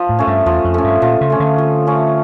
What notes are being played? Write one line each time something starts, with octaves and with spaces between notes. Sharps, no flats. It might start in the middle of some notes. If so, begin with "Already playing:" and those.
Already playing: F3
A2
A3 C#4
G2
E2 F3
F2
A3 C#4
G2
A#2 F3
C#3
A3 C#4
D3
F3
A3 C#4